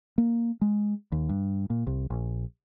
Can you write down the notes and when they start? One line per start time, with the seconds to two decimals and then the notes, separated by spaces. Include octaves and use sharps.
0.18 A#3
0.61 G#3
1.12 D#2
1.29 G2
1.70 A#2
1.87 C2
2.10 A#1